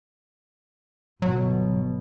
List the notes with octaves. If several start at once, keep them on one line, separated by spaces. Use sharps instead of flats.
G1 B2 F#3